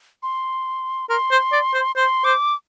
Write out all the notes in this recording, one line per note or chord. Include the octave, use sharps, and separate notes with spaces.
C6
A#4 C6
C5
D5
C5
C5 C6
C5 D6